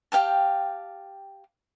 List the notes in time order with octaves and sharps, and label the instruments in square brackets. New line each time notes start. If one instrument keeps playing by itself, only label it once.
[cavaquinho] G4 F5 G5 A5